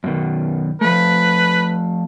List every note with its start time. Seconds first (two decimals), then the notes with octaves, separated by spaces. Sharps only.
0.04 F#2 B2 D#3
0.81 F3 A3 B4